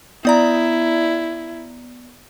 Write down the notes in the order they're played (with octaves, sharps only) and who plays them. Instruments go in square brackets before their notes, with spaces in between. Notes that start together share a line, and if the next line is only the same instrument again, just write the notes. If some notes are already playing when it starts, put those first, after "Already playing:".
[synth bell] B3 D5 A#5 [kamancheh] E4